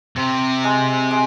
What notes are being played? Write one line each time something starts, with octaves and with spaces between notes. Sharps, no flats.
C3 C4
G#3
G#3